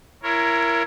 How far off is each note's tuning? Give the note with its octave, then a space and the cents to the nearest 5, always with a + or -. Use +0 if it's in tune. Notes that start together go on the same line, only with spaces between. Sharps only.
E4 +30 A#4 +0 C#5 +0